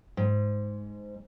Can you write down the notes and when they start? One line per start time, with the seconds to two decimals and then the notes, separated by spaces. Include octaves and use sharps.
0.17 G#2